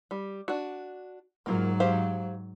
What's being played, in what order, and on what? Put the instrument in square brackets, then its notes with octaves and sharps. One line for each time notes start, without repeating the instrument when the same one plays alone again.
[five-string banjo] G3
D4 F#4
[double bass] G#2 F#3 [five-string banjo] A#3 F4 A#4
[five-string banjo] G4 C5 F5